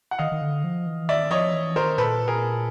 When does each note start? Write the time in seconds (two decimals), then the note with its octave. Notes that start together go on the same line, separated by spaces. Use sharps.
0.11 F#5
0.19 D#3 D#5 F5
0.32 D#3
0.41 D3
0.64 F3
0.86 E3
1.09 D#3 D5 E5
1.30 F3 C#5 D#5
1.53 E3
1.76 D#3 A#4 C5
1.98 A#2 A4 B4
2.28 G#4 A#4